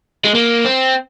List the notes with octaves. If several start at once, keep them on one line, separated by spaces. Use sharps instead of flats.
G#3
A#3
C4